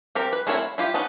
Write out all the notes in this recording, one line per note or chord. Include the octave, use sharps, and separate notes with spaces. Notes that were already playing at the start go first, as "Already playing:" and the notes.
C4 G4 A#4
B4
A3 C4 E4 A#4 C#5
B5
E4 F4 G4
B3 C#4 D#4 A5